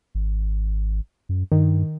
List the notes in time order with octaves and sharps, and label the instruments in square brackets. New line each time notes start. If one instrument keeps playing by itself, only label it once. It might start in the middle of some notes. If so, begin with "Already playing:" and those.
[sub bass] G#1
F#2
[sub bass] G2 [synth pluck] D#3